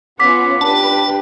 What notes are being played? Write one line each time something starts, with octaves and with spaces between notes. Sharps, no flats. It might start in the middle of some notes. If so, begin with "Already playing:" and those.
B3 C#4 F4 F#5 D6 B6
D4 G4 B4 A5